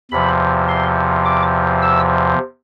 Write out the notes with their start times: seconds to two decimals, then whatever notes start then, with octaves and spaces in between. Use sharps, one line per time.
0.11 E2 C3 F3 B5
0.68 C6
1.25 D6
1.83 E6